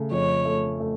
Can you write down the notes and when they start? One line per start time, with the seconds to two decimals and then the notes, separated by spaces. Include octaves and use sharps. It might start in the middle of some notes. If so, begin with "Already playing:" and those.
Already playing: C#3 A3
0.11 F2 C#5
0.45 A3
0.80 A3